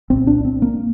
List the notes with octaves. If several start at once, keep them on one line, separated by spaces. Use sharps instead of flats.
C2 A#2 C4
D4
C4
A#3